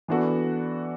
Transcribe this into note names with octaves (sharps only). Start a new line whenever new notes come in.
E3 B3 D4 F#4 A4